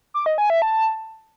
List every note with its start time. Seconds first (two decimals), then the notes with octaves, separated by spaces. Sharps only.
0.14 D6
0.26 D#5
0.38 G#5
0.50 E5
0.62 A5